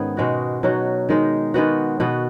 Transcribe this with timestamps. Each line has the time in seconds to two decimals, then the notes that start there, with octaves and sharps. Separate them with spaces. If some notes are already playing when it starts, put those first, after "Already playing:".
Already playing: G#2 D#3 B3 C#4 G#4
0.17 B2 G#3 D#4 F#4
0.63 B2 F#3 D#4 F#4
1.09 D#3 G#3 D#4
1.54 D#3 G#3 B3 F#4
2.00 B2 B3 F#4